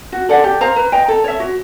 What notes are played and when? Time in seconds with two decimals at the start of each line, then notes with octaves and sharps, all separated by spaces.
0.12 F#4
0.29 A4 D5 F#5
0.44 G4
0.61 C5 F5 A#5
0.76 B4
0.92 D#5 G5 A#5
1.08 A4
1.24 C#5 E5
1.40 F#4